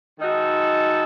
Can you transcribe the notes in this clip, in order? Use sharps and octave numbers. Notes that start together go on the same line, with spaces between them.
D#3 G#3 D#4 F#4 A4